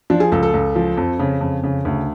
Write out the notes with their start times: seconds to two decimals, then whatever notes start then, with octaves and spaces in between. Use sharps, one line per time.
0.10 F3 D4
0.20 G#4
0.32 C#2 A4
0.43 A4
0.54 C#2
0.75 F3
0.97 F2
1.19 C#3
1.41 F2
1.63 C#3
1.85 D2